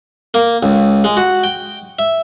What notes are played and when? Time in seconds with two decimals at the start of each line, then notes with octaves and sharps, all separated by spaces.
0.34 A#3
0.63 C#2
1.04 G#3
1.17 F#4
1.44 G5
1.99 E5